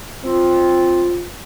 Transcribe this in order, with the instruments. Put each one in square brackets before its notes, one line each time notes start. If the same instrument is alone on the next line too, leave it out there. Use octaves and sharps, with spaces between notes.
[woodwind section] C4 F4